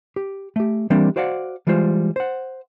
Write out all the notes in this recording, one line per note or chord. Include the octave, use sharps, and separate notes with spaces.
G4
A3 G4
E3 G3 A#3 C4 D4
F#4 C5 D5 F5 F#5
E3 G3 G#3 F4 C5
C5 F#5